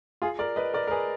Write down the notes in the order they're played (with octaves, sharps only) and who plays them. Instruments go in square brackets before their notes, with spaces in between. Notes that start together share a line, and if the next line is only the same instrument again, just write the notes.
[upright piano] F4 G#4
A#4 D5
B4 D#5
A#4 D5
A#4
G#4 B4